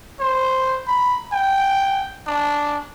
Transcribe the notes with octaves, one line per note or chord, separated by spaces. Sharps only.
C5
B5
G5
D4